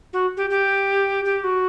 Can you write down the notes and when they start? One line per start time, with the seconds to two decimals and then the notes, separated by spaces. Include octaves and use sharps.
0.13 F#4
0.37 G4
0.50 G4
1.25 G4
1.44 F#4